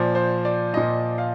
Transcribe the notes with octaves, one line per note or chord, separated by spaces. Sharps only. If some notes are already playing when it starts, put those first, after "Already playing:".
Already playing: A#2 F3 D5
C5
D5
A#2 F3 D#5
F5